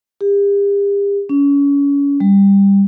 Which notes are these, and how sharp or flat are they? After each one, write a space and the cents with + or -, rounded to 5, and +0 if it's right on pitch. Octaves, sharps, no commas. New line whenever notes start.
G4 +40
C#4 +30
G3 +15